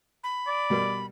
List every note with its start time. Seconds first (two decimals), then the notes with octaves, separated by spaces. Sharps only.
0.24 B5
0.47 D5
0.70 B2 G3 A#4